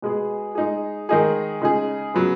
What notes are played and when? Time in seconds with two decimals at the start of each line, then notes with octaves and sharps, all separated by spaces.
0.02 B2 G#3 B3 G#4
0.55 G#3 D#4 G#4
1.09 D#3 G#3 D#4 G#4
1.61 C#3 G#3 D#4 G#4
2.14 C#3 F#3 B3